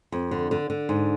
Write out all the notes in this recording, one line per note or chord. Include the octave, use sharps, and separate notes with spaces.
F2
D3
D3
D3
G#2